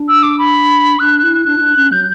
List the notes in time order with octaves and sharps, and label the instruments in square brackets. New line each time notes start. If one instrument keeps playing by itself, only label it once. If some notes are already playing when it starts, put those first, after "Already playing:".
Already playing: [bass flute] D4
[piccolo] E6
D6
B5
[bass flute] D4 [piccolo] F#6
[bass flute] E4
[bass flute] D4 [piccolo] F#6
[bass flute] E4
D4
C#4
[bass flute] F#3 [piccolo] G6